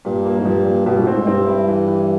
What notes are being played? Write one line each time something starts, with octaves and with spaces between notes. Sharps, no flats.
G2 A#2
A#3
G#2
G2 F3
A#2
G2 B2
A#2
A2 C4
G#2
G2 C4
E4
E3
E3